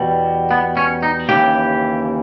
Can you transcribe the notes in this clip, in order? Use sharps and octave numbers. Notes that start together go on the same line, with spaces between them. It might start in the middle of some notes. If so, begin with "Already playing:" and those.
Already playing: E2 B2 G3
B3
C#4
D#4
D#2 C#3 E3 G4